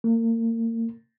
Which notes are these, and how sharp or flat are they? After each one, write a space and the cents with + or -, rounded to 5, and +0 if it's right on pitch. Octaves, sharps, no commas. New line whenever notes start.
A#3 -35